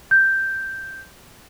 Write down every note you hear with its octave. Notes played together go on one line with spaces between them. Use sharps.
G6